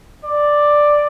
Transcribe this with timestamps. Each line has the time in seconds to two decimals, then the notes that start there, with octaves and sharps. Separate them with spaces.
0.24 D5